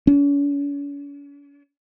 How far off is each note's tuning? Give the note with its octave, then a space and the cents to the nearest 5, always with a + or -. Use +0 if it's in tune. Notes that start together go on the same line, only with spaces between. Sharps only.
C#4 +45